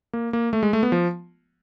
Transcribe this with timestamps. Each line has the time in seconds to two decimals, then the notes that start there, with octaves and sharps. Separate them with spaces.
0.13 A#3
0.33 A#3
0.53 A3
0.63 G#3
0.73 A3
0.83 B3
0.92 F3